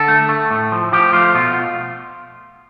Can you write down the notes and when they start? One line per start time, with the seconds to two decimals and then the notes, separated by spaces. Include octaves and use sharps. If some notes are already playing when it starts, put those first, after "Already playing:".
Already playing: D3 A4
0.08 A3
0.29 A3
0.51 A2
0.72 F3
0.92 F3 G4
1.13 A3 F4
1.35 B2 F4